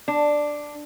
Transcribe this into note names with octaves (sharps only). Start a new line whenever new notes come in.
D4